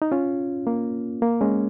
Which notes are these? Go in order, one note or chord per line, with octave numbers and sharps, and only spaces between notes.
D#4
C#4 F4
A#3
A#3
G#3 C#4